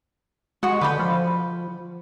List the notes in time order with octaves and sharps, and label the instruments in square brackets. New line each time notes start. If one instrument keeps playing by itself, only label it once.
[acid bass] G#3 [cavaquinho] F#4 F#5 C#6
[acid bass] D3 [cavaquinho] B4 G5 B5
[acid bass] F3